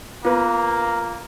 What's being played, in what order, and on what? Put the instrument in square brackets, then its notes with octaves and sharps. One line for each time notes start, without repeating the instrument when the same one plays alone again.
[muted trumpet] A#3 [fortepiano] B3 B4 [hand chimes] F4